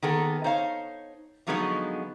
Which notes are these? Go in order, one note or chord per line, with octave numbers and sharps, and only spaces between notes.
D#3 A#3 B3 G#4 A4
D#4 C5 C#5 F5
D3 F3 F#3 G#3 B3 D#4